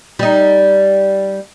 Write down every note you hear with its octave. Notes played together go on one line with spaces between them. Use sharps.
G3 D#4